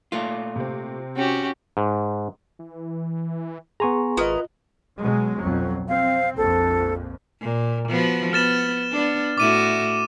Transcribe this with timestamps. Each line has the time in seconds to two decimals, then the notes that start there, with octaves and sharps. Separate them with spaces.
0.12 A#2 A3 F4
0.56 C3 C4
1.17 C#4 F#4 G4
1.77 G#2
2.59 E3
3.80 B3 G#4 G#5 A#5 C6 C#6
4.17 G#1 B3 E4 F4 A#4 D#5
4.99 B2 F#3 G#3
5.39 B1 F2 F#3
5.89 C4 F5
6.37 A#1 F2 A4
7.42 A#2
7.89 F3 B3 F#4
8.33 B3 F6 A6 E7
8.91 B3 D4
9.38 A2 E4 F#4 D6 D#7 E7